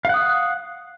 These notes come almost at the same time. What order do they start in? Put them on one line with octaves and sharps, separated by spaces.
F5 F#5 D#6